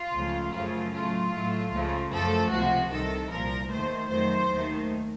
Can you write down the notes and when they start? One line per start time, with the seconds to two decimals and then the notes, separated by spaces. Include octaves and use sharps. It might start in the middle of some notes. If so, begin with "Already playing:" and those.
Already playing: F4
0.14 C#2 C#3 F3 A3
0.54 F#2 C#3 F3 A3 F4
0.94 A2 F#3 A3 F4
1.33 A2 F#3 A3
1.73 C#2 C#3 F3 A3
2.12 F#2 F3 A3 A4
2.51 C#2 C3 F3 F#4
2.91 C2 C3 D#3 A4
3.30 C2 A#2 F3 A#4
3.71 D#2 D#3 A3 C5
4.09 F2 D#3 F#3 A3 C5
4.49 D#2 D#3 A3